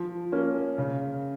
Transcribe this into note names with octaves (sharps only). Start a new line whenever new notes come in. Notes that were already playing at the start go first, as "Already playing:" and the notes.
Already playing: F3
A#3 C#4
C#3